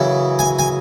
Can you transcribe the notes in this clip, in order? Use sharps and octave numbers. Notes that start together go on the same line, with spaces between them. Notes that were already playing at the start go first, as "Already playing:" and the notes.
Already playing: F#2 C#3 E3
G#5
G#5